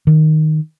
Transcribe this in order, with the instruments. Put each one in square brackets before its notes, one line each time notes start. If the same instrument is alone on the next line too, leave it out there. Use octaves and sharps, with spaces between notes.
[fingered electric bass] D#3